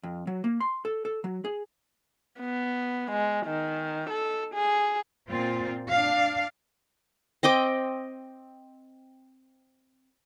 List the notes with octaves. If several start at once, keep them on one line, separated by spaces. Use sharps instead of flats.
F2
F#3
A#3
C6
A4
A4
F#3
G#4
B3
G#3
D#3
A4
G#4
A#2 C4 F4
D4 F5
C4 D#5 G5 D6